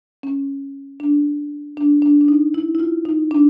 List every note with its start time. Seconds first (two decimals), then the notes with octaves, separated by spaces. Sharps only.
0.23 C#4
1.00 D4
1.77 D4
2.02 D4
2.21 D4
2.28 D#4
2.54 E4
2.75 E4
2.80 F4
3.05 D#4
3.31 D4